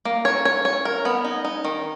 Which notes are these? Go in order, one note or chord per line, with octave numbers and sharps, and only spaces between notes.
A#3
C#5
C#5
C#5
A#4
B3
D#4
D#4
D#3